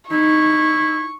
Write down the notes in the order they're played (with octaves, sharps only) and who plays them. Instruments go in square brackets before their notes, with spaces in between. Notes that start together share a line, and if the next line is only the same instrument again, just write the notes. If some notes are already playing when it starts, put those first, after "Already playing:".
[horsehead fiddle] D#4 [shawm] E4 [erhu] C#6